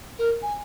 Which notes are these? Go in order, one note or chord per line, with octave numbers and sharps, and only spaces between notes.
A#4
G#5